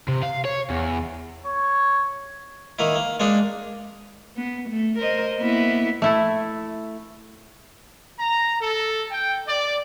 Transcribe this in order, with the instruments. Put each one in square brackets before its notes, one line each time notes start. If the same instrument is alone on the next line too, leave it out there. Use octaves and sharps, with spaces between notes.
[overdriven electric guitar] C3
F5
C#5
E2
[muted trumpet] C#5
[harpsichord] D#3 A#3 E4
A#3
G#3 A#3 D4 D#4
[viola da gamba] B3
A3
A#4 C5 D#5
A#3 B3 E4
[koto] A3 E4 A4
[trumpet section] A#5
A4
G5
D5